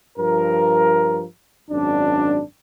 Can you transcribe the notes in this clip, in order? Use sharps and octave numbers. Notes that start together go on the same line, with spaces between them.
G2 F3 A#4
G#1 F#2 D4